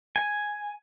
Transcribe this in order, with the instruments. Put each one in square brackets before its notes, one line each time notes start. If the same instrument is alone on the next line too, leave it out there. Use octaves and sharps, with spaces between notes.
[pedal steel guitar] G#5